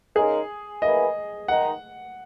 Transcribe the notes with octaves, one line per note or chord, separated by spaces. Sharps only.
C#3 G#3 D#4 G#4 A#4
A#3 E4 G#4 B4 D#5
D#3 G#3 D#4 F#5